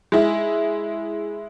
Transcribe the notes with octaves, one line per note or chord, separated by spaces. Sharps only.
G#3 E4